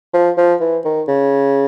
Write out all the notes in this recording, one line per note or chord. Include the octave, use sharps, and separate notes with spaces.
F3
F3
E3
D#3
C#3